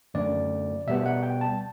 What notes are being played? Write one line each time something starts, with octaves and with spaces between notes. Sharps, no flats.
F#2 D3 A3 D5
B2 G3 B3 E5
F#5
G5
A5